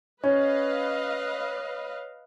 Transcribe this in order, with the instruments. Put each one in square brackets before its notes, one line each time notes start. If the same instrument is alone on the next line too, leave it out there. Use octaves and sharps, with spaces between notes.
[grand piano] C#4 [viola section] B4 D#5 F5 [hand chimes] C#5